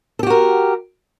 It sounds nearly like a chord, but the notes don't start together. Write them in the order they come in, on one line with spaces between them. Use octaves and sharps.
A4 G4 F#4 A#4